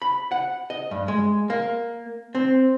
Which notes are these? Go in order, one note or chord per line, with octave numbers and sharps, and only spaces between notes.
B5
F#5
D#5
G2
G#3
A#3
C4